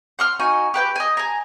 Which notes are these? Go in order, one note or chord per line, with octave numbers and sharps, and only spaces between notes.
F#5 C6 F6
D#4 F#4 G#5
G4 B4 G5
D#5 G#5
G#5 A#5